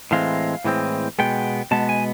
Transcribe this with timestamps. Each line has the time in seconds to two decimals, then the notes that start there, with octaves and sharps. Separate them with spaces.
0.11 A2 E3 G#3 C4 F5
0.64 A2 E3 G#3 C4
1.19 B2 G#3 B3 G5
1.71 B2 G#3 B3 A5
1.89 G#5